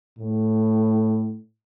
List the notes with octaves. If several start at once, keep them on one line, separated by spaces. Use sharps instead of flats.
A2